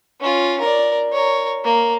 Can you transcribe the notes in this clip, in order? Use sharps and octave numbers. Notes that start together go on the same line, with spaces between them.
C#4 F4
A#4 D5
A#4 C#5
A#3